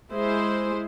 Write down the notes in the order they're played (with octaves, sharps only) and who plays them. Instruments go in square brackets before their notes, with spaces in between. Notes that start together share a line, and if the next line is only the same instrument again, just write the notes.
[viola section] G#3 E4 C5